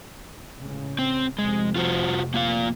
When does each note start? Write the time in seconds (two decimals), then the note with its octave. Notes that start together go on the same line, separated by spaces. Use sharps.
0.58 C#2 A2 C#3
0.99 C4
1.38 F1 F2 C3 G#3
1.76 F4 F#4 C5
2.34 A#3 F4 F5